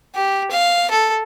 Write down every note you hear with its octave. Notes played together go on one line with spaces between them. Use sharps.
G4
F5
A4